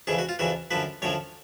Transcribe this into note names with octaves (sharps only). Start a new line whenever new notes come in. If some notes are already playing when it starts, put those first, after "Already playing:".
F2 C#3 E3 G#4
F#4
F4
F2 C#3 E3 F#4
F#2 D3 F3 B4
F#2 D3 F3 C#5